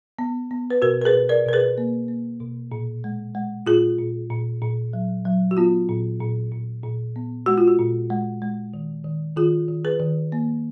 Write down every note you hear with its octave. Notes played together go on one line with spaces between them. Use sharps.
B3
B3
B4
B2 F#4 A#4
A#4
G#4 B4
B2
A#4 D5
B2 A#4
G#4 B4
A#3
A#3
B2
A#2
G#3
G#3
A#2 F4 G#4
A#2
A#2
A#2
F#3
F#3
F#4
B3 F4
A#2
A#2
A#2
A#2
B3
G#3 F#4
F4
F#4
A#2
G#3
G#3
D#3
D#3
D#3 F4 G#4
D#3
G#4 B4
D#3
A#3